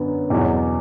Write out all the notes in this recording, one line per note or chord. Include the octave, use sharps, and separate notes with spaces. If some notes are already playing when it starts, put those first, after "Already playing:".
Already playing: F#2 D3 F#3 B3
E2 B2 F#3